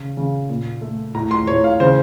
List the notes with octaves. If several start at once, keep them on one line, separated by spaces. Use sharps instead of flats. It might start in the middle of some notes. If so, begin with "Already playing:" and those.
Already playing: C#3
C#3
A#2
A3
A2 A#5
C6
A2 C#5
F5
C#3 C5